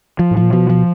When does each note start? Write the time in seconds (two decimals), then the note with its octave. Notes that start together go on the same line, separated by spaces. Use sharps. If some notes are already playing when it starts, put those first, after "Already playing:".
0.19 F3
0.31 A2
0.37 F3
0.42 A#2
0.53 B2 F3
0.70 F3